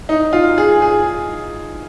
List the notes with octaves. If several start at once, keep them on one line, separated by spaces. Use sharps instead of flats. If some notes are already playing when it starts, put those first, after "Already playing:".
D#4
F4
G#4
G#4